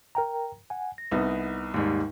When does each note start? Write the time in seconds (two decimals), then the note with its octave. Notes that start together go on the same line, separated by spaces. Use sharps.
0.15 A#4 G5 A#5
0.70 F#5 G#5
0.98 A#6
1.12 C2 B3 D#4
1.74 D#2 G#2 G3